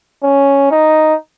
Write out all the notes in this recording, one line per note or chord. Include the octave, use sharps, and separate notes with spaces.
C#4
D#4